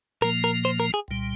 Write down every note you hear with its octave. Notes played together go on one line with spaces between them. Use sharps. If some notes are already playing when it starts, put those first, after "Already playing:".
A#2 F3 A#3 A#4
A#4
C5
A#4
G#4
C2 A#2 G3